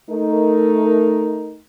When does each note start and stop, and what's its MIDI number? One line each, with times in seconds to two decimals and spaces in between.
0.10 1.60 57
0.10 1.60 63
0.10 1.60 70